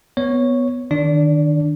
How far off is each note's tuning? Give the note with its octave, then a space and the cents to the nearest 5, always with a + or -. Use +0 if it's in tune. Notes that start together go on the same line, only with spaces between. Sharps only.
B3 +0 C#5 +0
D#3 -10 D4 +5 D5 -25